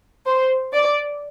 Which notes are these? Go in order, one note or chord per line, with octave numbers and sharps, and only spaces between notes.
C5
D5